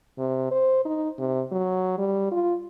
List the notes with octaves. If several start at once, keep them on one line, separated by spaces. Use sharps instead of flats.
C3
C5
D#4
C3
F#3
G3
F4